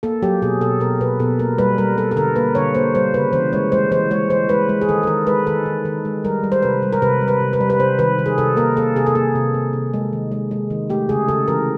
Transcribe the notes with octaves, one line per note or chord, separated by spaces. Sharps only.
A#3 A4
F#3 G4
B2 G#4
B2 A4
B2 A#4
B2 B4
B2 A4
A#3 A#4
G3 B4
G3 A#4
G3 A4
A4
D3 A#4
A#3 B4
D3 C#5
A#3 C5
G3 C5
C#3 B4
E3 C5
G#3 C#5
G#3 C5
E3 C5
G#3 C#5
E3 C5
G#3 B4
G#3
G#4
D#3 A4
A4
D#3 A#4
G#3 B4
D#3 A4
D#3
D#3
G#3
G3 A#4
G3
C5
C3 B4
G3
A#4
C3 B4
G3
B4
C3
B4
G3
B4
C3 C5
D#3 B4
D#3
G#4
C3 A4
A#3 A#4
A#3 A4
C3 G#4
A4
A#3 G#4
C3
C3
C3
G#3
D#3
G#3
G#3
D#3
A3 G4
C#3 G#4
C#3 A4
E3 A#4